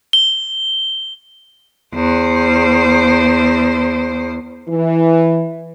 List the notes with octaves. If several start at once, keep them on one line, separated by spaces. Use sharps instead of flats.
G7
E2 C5
E3